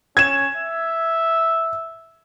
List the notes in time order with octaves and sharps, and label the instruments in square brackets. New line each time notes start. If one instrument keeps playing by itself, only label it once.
[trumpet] C#4 [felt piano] G#6 E7
[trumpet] E5